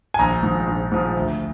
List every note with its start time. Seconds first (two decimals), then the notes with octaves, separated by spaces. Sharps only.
0.14 G#5
0.19 A#1 A#5
0.43 G#2 F3
0.67 A#1
0.92 G#2 F3
1.16 D2